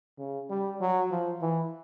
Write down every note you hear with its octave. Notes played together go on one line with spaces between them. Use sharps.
C#3
G3
F#3
F3
E3